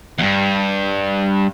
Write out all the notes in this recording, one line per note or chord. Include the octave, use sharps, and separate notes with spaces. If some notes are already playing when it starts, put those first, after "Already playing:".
E2 G2